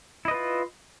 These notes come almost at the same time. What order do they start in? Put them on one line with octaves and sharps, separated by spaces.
E4 D#5 B4 F4